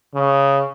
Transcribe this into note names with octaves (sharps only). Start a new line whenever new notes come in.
C#3